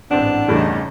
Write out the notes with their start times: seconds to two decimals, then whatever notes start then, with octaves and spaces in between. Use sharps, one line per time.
0.11 A1 G#2 B3 C4 D4
0.48 E2 G2 C#3 A3 D#4